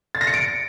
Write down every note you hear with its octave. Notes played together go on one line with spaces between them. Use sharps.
A6
A#6
C#7
D7